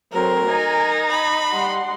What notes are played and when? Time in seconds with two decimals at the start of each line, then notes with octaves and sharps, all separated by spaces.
0.12 F#3 A3 C4 A#4
0.49 D#4 G#5
1.12 B5
1.52 G3 F#5 C6